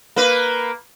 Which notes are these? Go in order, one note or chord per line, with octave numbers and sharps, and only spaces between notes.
A#3 B4